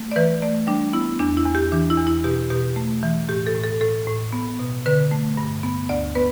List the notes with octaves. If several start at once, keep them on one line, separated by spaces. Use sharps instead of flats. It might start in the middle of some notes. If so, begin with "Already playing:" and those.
Already playing: A3
D5
E3 B4
A3 D5
G3 D4
B3 E4
E2 D4
E4
E2
G4
E3 D4
E4
E2
E4
B2 G4
B2 G4
A3
E3
A2 G4
A4
A2
A4
A2 A4
A2
B3
B2
D3 B4
A3
G2
B3
D2 D5
B3 B4